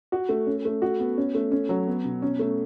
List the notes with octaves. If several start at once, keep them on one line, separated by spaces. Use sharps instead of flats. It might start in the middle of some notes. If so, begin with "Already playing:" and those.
F#4
A3
C#4
A3
F#4
B3
C#4
A3
C#4
F#3
B3
B2
C#4
A3